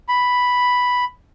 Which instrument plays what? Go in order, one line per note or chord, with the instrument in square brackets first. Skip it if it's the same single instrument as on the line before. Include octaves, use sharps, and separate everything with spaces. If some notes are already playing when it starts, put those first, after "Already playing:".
[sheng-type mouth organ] B5